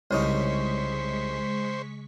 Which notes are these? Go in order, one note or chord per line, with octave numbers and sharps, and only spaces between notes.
C2 C#3 G#3 C#4 D#4 C5 C#6 B6